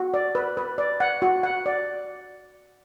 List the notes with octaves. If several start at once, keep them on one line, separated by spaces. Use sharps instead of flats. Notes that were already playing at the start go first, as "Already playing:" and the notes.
Already playing: F#4
D5
B4
B4
D5
F#5
F#4
F#5
D5